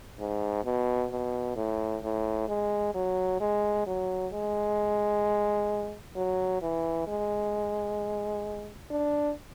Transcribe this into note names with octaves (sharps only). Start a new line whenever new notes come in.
G#2
B2
B2
A2
A2
G#3
F#3
G#3
F#3
G#3
F#3
E3
G#3
D4